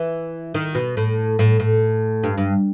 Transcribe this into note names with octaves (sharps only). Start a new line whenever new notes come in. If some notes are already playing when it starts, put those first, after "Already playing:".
Already playing: E3
D#3
B2
A2
A2
A2
G2
G2